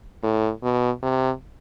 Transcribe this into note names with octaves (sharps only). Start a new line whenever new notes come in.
A2
B2
C3